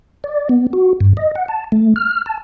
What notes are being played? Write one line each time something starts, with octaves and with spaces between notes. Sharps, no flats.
D5
B3
F#4
G2
D#5
F#5
A5
A3
F6
A5